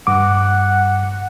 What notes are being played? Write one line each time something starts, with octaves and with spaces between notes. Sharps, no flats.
G2 F#5 D6